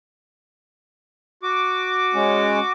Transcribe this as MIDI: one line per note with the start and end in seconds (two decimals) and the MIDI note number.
1.43 2.73 66
1.43 2.73 86
2.14 2.59 56
2.14 2.59 61